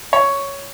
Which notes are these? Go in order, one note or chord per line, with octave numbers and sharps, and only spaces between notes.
C#5